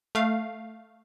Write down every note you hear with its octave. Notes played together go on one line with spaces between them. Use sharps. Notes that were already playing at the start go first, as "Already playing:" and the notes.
A3 F5